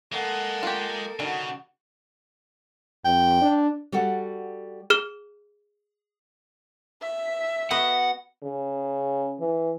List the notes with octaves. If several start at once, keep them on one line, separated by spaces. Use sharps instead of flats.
G#3 A#3 A4 F#5
F4 G4
C#3 G3 D4 D#4 F#4 F#5
F2 G5
D4
G3 F#4 A4 F#5
G#4 F6 G7
E5
B3 F#4 D#5 F#5
C#3
E3